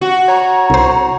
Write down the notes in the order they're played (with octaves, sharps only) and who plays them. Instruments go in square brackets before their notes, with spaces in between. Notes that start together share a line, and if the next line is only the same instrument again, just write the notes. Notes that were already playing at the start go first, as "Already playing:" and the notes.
[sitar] F#4
[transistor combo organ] C#5 [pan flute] A#5
[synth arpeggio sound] C2 C5